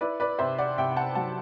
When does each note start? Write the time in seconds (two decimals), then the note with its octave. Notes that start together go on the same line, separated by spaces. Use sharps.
0.01 E4 B4 D5
0.20 B4 D5
0.39 C3 C5 E5
0.58 D5 F#5
0.78 C3 E5 G5
0.92 G5
0.97 F#5 A5
1.15 F#3 F#5 A5